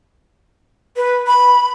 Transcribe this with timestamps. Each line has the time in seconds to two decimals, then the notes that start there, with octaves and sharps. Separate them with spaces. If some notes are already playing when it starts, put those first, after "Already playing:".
0.96 B4
1.27 B5